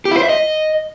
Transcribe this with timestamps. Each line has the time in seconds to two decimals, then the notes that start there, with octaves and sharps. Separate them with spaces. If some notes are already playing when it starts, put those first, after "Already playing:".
0.05 G4
0.11 E4
0.17 C5
0.23 E5
0.29 D#5